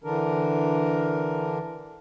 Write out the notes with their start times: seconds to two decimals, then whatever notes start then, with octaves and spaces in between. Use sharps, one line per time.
0.04 D3 E3 D4 A#4